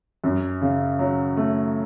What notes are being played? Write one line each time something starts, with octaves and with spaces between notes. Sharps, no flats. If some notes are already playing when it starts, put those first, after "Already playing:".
F#2
C#3
F#3
A3